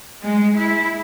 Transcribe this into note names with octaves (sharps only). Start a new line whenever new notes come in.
G#3
E4